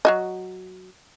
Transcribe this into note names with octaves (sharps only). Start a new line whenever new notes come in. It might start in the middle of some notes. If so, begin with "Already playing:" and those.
F#3 F#4 D#5